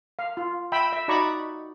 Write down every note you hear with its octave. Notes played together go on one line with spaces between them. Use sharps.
F5
F4
E5 G5 B5 E6
E5
D#4 F#4 D5 A#5 B5 C#6